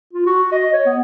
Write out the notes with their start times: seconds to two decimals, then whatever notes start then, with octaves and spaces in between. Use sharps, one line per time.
0.13 F4
0.27 F#4
0.52 D#5
0.73 C#5
0.86 B3